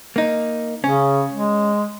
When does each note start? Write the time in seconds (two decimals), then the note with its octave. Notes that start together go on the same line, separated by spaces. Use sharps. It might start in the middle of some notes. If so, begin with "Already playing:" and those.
0.16 A#3 D#4
0.84 C#3 C#4
1.33 G#3